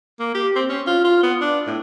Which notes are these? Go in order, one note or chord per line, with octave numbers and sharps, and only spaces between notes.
A#3
G4
C4
C#4
F4
F4
B3
D4
A2